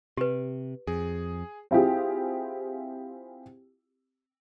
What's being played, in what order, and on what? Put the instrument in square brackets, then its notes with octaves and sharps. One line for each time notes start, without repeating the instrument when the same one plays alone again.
[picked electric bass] C3 [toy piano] G4 B4
[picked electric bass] F2 [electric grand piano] G#4
[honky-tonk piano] C4 E4 F4 G4 G#4